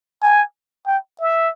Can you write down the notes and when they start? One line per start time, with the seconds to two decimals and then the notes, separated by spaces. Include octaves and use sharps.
0.22 G#5
0.87 G5
1.20 E5